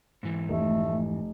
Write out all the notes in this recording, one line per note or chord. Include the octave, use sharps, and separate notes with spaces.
G#2 E3
F1 A3